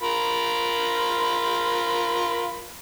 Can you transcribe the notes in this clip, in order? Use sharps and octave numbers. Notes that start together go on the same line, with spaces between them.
F4 A#4 B5